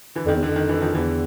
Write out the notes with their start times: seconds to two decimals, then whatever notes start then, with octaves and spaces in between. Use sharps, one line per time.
0.15 D3 E3
0.26 F2 D#3
0.36 E2
0.43 F2 D3
0.56 D#3
0.68 D3 E3
0.82 D#3 F3
0.95 E2 D3 E3